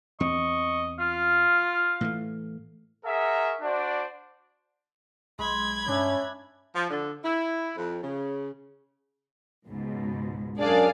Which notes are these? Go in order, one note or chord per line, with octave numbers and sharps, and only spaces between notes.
E2 C4 D#5 C#6
F4 F5
A2 E3 A3
G#4 A#4 E5 F#5 A#5 C#6
D4 F#4 C5 D5
B1 G#3 B5 G#6
G2 C#4 D4 E5
F3
D3
E4
F2
C#3
C#2 G#2 B2
F#2 D4 G#4 D5 F5